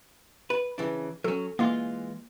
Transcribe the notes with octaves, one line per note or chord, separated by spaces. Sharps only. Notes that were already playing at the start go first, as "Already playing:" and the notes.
B4
C#3 E3 D4
F#3 C#4 A4
E3 G#3 A#3 F4